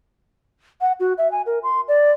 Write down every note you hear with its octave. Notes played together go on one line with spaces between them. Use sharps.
F#5
F#4
E5
G#5
A#4
C6
D5